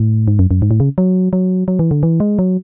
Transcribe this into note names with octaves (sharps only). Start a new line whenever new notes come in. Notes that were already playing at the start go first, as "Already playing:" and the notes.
Already playing: A2
G#2
F#2
F#2
G#2
A2
C#3
F#3
F#3
F#3
E3
D3
E3
G#3
F#3